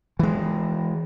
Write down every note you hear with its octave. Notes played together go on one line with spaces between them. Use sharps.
E3 G#3